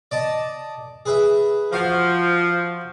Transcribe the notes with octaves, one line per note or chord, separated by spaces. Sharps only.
D5 D#5 A5
G#4 B4 E5
F3 F#4 F5